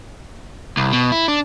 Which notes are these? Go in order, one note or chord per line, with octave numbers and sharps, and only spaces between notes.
C2
B2
E4
D4